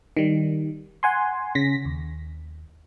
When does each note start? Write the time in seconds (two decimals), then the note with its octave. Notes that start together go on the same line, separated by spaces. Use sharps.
0.17 D#3 G3
1.03 F#5 G#5 C6
1.55 C#3 A#6 B6
1.85 D#2